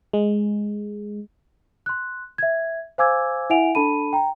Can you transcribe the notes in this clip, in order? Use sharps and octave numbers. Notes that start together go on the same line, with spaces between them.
G#3
C6 F#6
E5 G#6
C5 F5 G#5 D6 E6 G#6
E4 E5 F#5 G#5 D7 F7
D4 A4 A5 B5 D#7
G5 A#5